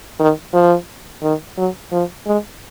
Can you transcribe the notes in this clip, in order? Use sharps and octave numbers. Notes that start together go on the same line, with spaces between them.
D#3
F3
D#3
F#3
F3
G#3